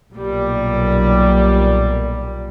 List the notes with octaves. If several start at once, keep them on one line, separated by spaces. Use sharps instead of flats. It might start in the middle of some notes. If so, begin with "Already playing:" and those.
B1 A#2 G3